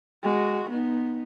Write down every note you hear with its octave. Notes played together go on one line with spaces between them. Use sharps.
G#3 F#4
B3 D#4